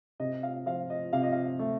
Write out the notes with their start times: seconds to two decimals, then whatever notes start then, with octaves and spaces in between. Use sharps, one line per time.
0.20 C3 D#5
0.43 F5
0.66 F3 F5
0.90 D#5
1.13 C3 F5
1.23 D#5
1.32 F5
1.59 A3